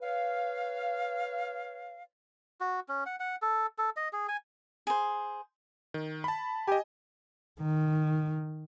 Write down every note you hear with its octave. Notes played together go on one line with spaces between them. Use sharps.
B4 C#5 F5
F#4
C#4
F#5
F#5
A4
A4
D#5
G#4
G#5
G#4 C5
D#3
A5 B5
G4 D#5 G#5
D#3